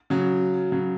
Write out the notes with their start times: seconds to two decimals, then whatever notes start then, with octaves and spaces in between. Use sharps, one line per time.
0.10 C#3 F#3
0.72 C#3 F#3